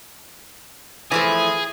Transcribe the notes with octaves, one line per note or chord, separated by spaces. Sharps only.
E3 F3 A3 G#4